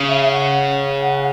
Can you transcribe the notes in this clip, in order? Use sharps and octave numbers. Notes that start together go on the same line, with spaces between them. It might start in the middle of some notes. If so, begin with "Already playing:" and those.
Already playing: C#3
E5
E5
F#5